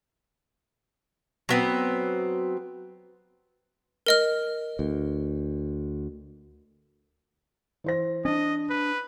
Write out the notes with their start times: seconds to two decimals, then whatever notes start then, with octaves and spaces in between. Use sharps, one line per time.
1.49 F#3 B3 C4
4.06 A#4 D#5 F6
4.79 D2
7.84 E3 C5 A#6
8.25 C#4 D4 D#5
8.70 B4